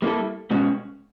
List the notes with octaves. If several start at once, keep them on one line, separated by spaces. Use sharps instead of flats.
G3 A#3 C#4 E4 A4
B2 G#3 C#4 F#4